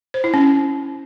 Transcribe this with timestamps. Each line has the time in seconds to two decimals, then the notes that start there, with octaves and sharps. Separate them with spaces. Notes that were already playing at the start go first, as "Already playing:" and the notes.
0.14 C5
0.24 E4
0.34 C#4